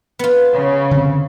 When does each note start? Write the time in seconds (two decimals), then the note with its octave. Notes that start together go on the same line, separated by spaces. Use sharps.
0.19 B3 F4
0.53 C#3
0.91 D3 C4